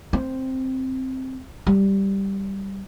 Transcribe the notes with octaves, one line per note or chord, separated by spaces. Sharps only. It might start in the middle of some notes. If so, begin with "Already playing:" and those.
C4
G3